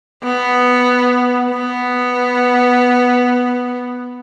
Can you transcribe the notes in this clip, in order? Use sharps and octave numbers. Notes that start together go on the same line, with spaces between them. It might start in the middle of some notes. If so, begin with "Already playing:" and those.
B3
B3